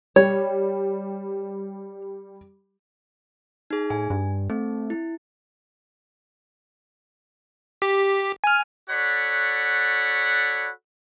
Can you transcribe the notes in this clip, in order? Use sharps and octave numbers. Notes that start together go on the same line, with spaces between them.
G3 C#5
D#4 G#4
A2 G#5
G2
A3 C4
E4
G4
G#5 F6
F#4 A4 C#5 D5 F#5 B5